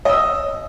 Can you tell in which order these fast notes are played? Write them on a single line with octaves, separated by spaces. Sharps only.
D#5 E6 D#6